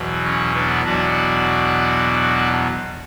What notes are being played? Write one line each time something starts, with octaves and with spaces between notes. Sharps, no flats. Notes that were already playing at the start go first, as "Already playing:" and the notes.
Already playing: E2 B2 F#3
C#4
B3 D4
E2 B2 F#3 D4 F#4